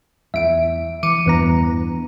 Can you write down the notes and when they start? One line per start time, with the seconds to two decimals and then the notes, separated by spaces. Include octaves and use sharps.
0.34 E2 E5 D7
1.03 E3 D6 C#7 D#7
1.26 E2 G2 E3 B3 A#5